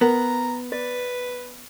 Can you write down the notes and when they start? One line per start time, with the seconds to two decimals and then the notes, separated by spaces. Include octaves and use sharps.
0.01 B3 A#4 A#5
0.72 B4 D5